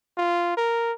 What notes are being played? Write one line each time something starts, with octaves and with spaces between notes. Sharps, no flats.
F4
A#4